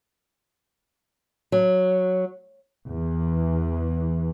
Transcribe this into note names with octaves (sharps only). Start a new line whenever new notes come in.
F#3
E2 E3